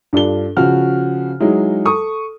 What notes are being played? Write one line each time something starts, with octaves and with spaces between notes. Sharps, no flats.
G2 D4 F4 A4 G7
C#3 F3 F#4 F6
F#3 G#3 D#4 E4
A4 C#6 D#6